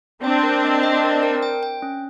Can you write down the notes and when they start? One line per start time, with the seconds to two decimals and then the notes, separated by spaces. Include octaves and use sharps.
0.24 C4 D4 G5
0.43 A#4
0.64 D#5
0.83 D#5
1.04 A#4
1.23 A#4
1.42 G5
1.63 G5
1.82 C#4